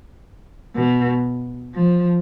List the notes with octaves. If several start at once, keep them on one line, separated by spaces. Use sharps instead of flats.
B2
F3